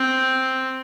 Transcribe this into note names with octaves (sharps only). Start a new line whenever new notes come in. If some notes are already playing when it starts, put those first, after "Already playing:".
Already playing: C4